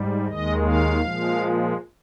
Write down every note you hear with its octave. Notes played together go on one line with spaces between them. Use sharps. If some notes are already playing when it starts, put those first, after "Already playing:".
Already playing: G#2 G3
D#2 D#3 G#3 D#5
F5
A#2 F3 G#3